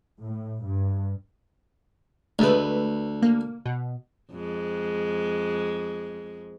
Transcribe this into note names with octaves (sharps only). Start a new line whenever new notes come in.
A2
G2
D2 G#3 A3 B4
A#3
B2
F2 G#3